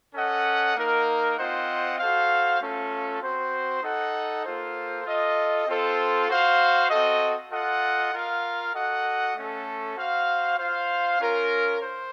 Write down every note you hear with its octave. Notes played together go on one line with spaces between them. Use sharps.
C#4 A4 D#5 F#5
A#3 D#4 A#4
C4 F4 C5 D#5 F#5
F#4 A4 C5 F5
A3 C#4 F4 A4
C4 F#4 C5
D#4 A4 D#5 F#5
A#3 F4 A4 C5
F4 A4 D#5
C4 F4 A4 C5
F#4 C5 F5
C4 F#4 A4 D#5
F4 A4 D#5 F#5
F4 A#4 F5
F#4 A4 D#5 F#5
A3 C#4 A4
F#4 C5 F5
F4 C5 F5
C#4 F4 A#4
C5